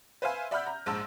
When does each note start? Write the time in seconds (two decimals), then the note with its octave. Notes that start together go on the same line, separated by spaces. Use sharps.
0.22 B4 C5 E5 F5 G#5
0.51 D5 E5 F#5 B5 F6 G6
0.67 A#5
0.86 A#1 G#2 A5 E6